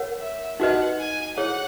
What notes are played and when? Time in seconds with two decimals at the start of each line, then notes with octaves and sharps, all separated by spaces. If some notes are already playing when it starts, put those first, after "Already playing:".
Already playing: A#4 C#5 F#5
0.20 E5
0.60 D#4 F#4 B4 D#5 F#5
0.99 G#5
1.37 E4 G#4 C#5 F#5